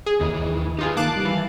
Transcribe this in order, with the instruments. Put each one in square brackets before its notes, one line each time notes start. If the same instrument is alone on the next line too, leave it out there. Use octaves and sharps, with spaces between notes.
[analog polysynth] G#4
[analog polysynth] D#2 [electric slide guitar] D#3 E3
[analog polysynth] D#4 F4 G#4 [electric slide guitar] G4 B4
[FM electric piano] D#3 A#3 [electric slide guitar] F5 [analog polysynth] A5 D6 F#6
[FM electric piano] D#3 G3
[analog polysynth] E3